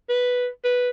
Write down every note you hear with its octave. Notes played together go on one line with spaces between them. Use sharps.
B4
B4